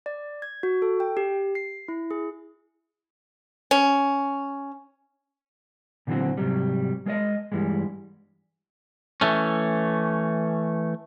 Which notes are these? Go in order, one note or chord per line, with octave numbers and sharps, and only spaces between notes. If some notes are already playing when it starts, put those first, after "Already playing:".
D5
G#6
F#4
A4
G5
G4
C7
E4
G#4
C#4
A#2 D3 E3 F#3 C4 F#4
G#2 C3 F#3 G3
G#3 A#4 D5 D#5
G2 B2 E3 G3 G#3
E3 A3 C#4